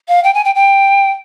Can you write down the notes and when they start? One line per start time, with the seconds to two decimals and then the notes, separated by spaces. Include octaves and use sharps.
0.08 F5
0.24 G5
0.34 G#5
0.44 G5
0.55 G5